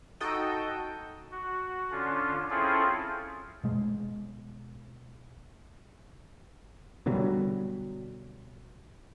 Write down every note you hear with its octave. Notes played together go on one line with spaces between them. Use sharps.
D#4 F#4 A4 D#5 G5
F#4
D3 C#4 D4 F4
C4 C#4 E4 F4 G#4 A4
B2 G#3
B2 D3 F#3 G3